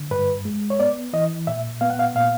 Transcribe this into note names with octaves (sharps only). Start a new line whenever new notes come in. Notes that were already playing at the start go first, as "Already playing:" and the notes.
Already playing: D3
G2 B4
G#3
C#5
B3 D5
E3 D#5
A#2 E5
B3 F5
F#5
F5
A#2 F5